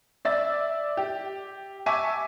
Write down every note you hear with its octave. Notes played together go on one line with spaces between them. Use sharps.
D5 E5 A6
G4
E5 G#5 A5 C#6 D6 B6